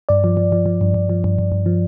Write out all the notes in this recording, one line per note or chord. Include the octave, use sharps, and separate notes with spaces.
G2 D5
F3
F3
F3
F3
G2
G2
F3
G2
G2
G2
F3